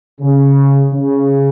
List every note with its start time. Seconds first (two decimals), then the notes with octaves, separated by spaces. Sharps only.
0.21 C#3
0.92 C#3